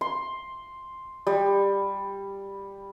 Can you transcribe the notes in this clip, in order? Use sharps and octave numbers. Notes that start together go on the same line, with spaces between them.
C6
G3